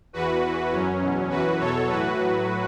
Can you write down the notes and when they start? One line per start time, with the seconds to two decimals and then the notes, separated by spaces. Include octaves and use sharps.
0.13 E2 E3 F#4 B4
0.43 E2 E3
0.71 F#2 F#3 C#4
1.00 E2 B2 F#3
1.30 F#2 E3 F#4 B4
1.59 E2 B2 F#3 A4 C#5
1.88 A2 E3 F#4 B4
2.17 A2 F#3